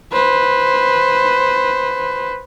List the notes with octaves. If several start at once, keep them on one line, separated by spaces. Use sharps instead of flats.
B4 C5